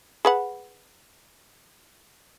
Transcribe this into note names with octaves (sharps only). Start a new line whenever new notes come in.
G#4 B4 F#5